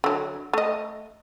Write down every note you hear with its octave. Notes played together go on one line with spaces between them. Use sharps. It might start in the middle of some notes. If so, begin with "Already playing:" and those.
D3 F#3
A3 D#5